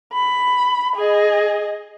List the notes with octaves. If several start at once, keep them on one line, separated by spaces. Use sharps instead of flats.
B5
G#4 D#5